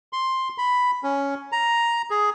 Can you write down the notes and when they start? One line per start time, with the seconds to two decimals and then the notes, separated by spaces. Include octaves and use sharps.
0.13 C6
0.58 B5
1.04 C#4
1.52 A#5
2.10 G#4